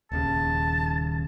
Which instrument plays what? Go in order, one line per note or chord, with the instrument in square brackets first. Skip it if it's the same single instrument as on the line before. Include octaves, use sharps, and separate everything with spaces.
[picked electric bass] D#1 D#2 C#3 [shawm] A5